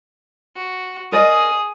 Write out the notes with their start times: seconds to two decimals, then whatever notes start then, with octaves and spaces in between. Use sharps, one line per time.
0.56 F#4
1.12 G#4 A#4 D5 D#5 D#6